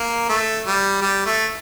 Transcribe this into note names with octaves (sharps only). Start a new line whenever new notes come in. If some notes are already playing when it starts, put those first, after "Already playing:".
Already playing: A#3
A3
G3
G3
A3